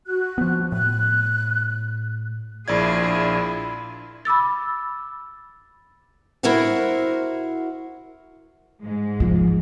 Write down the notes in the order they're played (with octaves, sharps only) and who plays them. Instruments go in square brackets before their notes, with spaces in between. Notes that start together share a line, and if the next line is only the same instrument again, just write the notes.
[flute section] F#4 F#6
[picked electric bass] F3 B3
[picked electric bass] A2 [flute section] F#6
[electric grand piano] A#1 D5 G#6 [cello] D4 G#4 [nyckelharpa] E4 F4
[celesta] B5 D6 E6 A6
[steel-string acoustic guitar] E4 F#4 A#4 C5 E5 F#5
[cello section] G#2 G#3
[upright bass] F3